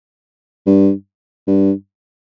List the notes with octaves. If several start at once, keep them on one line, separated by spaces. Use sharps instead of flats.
G2
G2